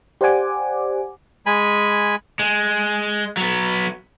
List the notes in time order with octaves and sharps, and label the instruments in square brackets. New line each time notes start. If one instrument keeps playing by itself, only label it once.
[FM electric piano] G4 C5 D5 F#5 G#5 D6
[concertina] G#3 G#5 B5
[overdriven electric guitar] G#3
F#3 B3